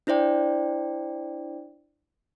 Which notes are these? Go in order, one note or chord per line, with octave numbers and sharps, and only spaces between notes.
D4 E4 C5 D5 G5